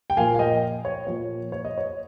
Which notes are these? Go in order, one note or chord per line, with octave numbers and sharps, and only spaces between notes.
G5
A#2 F3 F5 G#5
F5
D#5 G5
C#5
A#2 F3 C#5
C#5
D#5
C#5